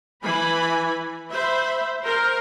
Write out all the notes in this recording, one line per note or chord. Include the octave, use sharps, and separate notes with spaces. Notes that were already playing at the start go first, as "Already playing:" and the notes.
E3 G#5 B5
C5 E5 B5
A#4 C5